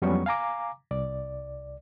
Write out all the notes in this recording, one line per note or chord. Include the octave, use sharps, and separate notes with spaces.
F2 F#3 G3 B3 C#4 C#6
F5 G#5 A#5 D6
C2 D5